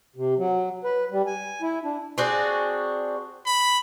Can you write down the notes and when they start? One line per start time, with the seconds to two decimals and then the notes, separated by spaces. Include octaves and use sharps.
0.16 C3
0.39 F#3
0.84 B4
1.12 G3
1.26 G#5
1.62 E4
1.84 D4
2.18 C4 D4 F#4 G#4
3.46 B5